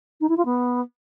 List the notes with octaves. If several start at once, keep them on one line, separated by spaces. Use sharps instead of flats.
D#4
E4
F4
B3